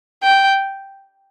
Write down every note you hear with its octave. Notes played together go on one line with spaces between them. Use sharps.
G5